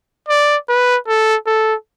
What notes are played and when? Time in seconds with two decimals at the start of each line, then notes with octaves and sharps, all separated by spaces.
0.29 D5
0.69 B4
1.08 A4
1.47 A4